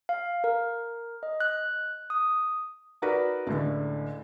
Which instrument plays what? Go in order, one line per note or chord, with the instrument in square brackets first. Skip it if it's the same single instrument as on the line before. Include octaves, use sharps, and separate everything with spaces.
[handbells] F5
A#4
D#5
F#6
D#6
[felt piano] D#4 F#4 A#4 B4 D5
C#2 A2 D3